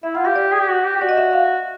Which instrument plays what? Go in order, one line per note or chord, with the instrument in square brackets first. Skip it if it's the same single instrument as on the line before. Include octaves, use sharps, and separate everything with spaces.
[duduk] E4 [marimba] E5
[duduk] F4 [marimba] F#5
[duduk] G4 [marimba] F5
[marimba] D5
[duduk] G#4
G4
F#4
G4
G4
[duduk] F#4 [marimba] D5
[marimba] D#5
E5
F5